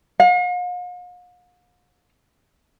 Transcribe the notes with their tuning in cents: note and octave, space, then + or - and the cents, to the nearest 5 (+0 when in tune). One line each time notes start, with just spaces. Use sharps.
F5 +45